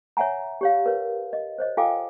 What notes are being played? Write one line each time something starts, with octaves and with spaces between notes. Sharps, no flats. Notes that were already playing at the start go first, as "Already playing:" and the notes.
C#5 E5 F#5 G#5 A#5
G4 C#5 F5
A#4 B4 C#5
D#5
C5 C#5 D#5
F4 A4 F5 G5 G#5 D6